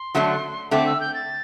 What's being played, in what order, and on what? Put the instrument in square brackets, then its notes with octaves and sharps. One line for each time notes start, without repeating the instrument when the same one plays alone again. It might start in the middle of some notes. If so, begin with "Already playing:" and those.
Already playing: [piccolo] C6
[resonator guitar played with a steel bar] D3 F#3 A3 D4
[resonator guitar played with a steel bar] D3 A3 C4 [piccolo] D6
[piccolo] E6
G6
A6